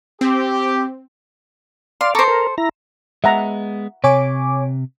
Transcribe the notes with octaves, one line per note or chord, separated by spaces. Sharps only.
C4 G4
D5 F5 C6
A4 C5 A#5 C#6 D6
A#4
E4 A#5
G#3 B3 E5 F#5 A#5
C3 C#5 G#5 D6